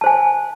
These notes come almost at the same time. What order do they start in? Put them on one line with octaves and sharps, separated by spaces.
A5 C5 G#5